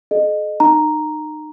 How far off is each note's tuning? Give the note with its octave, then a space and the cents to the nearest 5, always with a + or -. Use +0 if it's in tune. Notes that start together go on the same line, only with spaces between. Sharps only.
A4 -45 D#5 -25
D#4 -30 A#5 +0